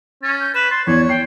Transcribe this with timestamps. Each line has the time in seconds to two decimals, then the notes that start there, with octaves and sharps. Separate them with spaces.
0.23 C#4 A6
0.40 G6
0.55 B4 E7
0.71 C6 A6
0.87 E2 C#5 G#6
1.09 G5 C7